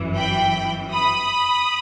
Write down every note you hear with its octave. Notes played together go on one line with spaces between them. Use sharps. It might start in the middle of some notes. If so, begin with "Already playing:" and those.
Already playing: G1 F#2 E3
G5 B5
B5 D#6